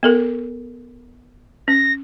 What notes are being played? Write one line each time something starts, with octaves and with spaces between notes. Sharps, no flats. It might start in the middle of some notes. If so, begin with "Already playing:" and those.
B3 A4 A#4
C#4 A#6